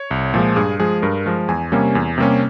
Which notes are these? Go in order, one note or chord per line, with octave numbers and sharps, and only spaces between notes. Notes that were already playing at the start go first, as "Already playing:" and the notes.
Already playing: C#5
C2
A#2 F3 G#3
G2 G#4
F3 G#3 G#4
G2 A#4
F3 G#3
E2 G#5
C3 G3 A#3 C#4
E2
C3 G3 A#3 C#4